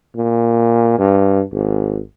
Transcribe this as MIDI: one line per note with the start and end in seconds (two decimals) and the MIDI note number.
0.16 0.97 46
0.98 1.42 43
1.52 2.00 32